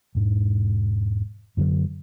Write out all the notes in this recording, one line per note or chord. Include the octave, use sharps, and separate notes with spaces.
E1 G#2
F#2 D3 F#3